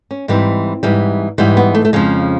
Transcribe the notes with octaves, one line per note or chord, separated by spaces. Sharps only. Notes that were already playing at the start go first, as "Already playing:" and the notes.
C#4
G#2 E3 G3 C4
G#2 E3 G3
G#2 E3 G3 B3
B3
A3
A3
F2 C#3 F3 G#3